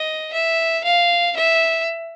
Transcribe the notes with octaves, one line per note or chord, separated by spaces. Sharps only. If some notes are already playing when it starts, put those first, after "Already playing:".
Already playing: D#5
E5
F5
E5